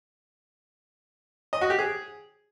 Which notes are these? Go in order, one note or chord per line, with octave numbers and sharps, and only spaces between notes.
D#5
F#4
G4
G#4